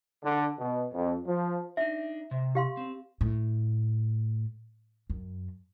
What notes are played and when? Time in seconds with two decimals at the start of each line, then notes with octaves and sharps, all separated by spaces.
0.24 D3
0.59 B2
0.94 F2
1.27 F3
1.77 D4 D#4 E5
2.31 C3
2.55 G4 F5 C6
2.77 C4
3.21 A2
5.10 F#2